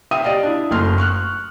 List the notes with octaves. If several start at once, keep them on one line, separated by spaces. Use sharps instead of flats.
E5 F5 G5 D#6 D#7
G4 D5 D#5 F5
D4 E4
F#1 A3 C6 F6
C#6 F6 F#6